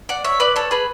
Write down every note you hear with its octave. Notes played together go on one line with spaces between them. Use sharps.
D5 F#5
C#5 E5
B4 D5
A4 C#5
G#4 B4